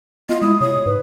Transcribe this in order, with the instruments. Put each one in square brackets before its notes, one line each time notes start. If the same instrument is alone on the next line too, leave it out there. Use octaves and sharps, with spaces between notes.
[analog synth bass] B3 [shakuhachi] F4 [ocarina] D#5
[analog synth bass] G#3 [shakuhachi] E4 [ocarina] D#6
[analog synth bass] C3 [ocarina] C#5 [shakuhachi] D#6
[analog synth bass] G#2 [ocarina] B4